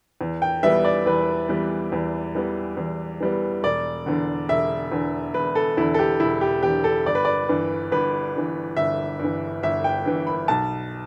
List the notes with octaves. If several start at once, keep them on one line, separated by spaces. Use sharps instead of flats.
E2
G5
E3 G3 B3 E5
D5
E2 B4
E3 G3 B3
E2
E3 G3 B3
E2
E3 G3 B3
E1 D5
E2 D3
E1 E5
E2 D3
E1 B4
A4
E2 D3 E4
A4
G4
E1 E4
G4
E2 D3 G4
A4
G1 D5
B4
D5
G2 E3
G1 B4
G2 E3
G1 E5
G2 E3
G1 E5
G5
G2 E3
B5
B1 A5